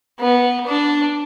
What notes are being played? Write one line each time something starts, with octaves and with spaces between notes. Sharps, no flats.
B3
D4